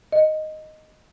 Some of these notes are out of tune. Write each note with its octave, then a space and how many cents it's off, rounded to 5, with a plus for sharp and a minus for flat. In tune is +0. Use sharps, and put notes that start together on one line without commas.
D#5 +0